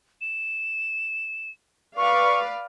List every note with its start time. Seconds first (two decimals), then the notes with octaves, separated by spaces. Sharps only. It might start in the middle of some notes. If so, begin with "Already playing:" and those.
0.21 E7
1.97 B4 D5 F5 C#6